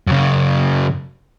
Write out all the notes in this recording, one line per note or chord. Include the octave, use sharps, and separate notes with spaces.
F#2 C#3